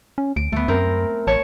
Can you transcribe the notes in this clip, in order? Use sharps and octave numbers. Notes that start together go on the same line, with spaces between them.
C#4
D2 D7
D2 A3 B3
F#2 C4 A#4
A1 C#5 A5